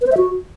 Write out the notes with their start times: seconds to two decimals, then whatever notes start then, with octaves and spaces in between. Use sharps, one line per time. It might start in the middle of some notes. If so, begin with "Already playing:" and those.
0.01 B4
0.07 C5
0.12 E5
0.17 F#4